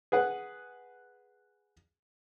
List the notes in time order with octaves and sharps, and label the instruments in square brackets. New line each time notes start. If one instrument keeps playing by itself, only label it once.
[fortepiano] G#4 B4 F#5